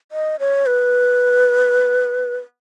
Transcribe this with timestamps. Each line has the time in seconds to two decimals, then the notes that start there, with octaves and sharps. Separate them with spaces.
0.12 D#5
0.40 C#5
0.66 B4